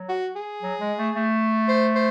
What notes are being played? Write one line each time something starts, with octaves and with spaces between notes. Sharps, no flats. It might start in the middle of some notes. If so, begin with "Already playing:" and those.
Already playing: F#3
F#4
G#4
F#3
G#3
A3
A3
C5
C5